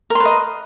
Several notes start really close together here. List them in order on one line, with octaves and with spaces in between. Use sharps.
A#4 C6 B4 D#5